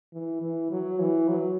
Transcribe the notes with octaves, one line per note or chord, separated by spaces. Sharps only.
E3
E3
F#3
E3
F#3